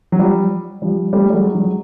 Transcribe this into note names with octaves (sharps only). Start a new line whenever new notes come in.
F#3
F3 G3
F3 G3
G3 A3
G3
F#3 G#3
F#3 G#3